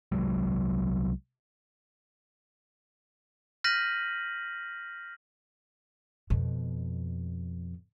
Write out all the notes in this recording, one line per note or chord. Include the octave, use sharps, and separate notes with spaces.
C2 F#3 G#3
F6 G6 A#6 B6 D#7 F#7
F2 B2